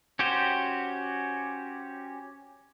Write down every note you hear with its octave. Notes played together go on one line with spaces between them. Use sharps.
C#4 F#4 G4 C5